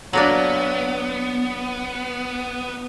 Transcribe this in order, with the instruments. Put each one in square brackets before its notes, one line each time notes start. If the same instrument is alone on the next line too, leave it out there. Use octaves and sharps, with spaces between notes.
[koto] F#3 A#3 D4 [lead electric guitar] B3